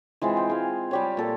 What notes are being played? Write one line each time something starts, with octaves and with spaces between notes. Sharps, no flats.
E3 G#3 C4 F4
G5
G#4 F5
G3 G4 C#5
A#2 A4